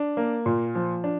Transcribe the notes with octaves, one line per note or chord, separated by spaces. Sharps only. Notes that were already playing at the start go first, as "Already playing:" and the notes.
Already playing: D4
A#3
A#2
F3
D4